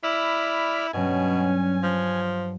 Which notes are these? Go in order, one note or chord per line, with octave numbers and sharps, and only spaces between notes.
E4 D5 B5 F6
G2 B2 F#3 C#4 G#5
F3